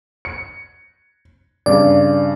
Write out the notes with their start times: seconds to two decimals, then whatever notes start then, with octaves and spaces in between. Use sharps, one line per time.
0.25 C#7
1.66 G2 C#3 D5